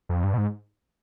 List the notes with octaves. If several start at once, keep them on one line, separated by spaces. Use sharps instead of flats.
F2
G2
B2
G#2